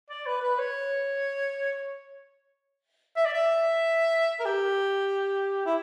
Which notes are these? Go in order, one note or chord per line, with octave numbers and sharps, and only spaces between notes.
D5
B4
B4
C#5
E5
D5
E5
A#4
G4
E4